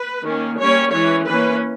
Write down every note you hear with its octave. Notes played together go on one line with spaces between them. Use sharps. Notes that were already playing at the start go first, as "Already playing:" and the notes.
Already playing: B4
D#3 A#3 C#4
G3 A#3 C#4 C#5
E3 G#3 C#4 C#5
E3 A#3 C#4 B4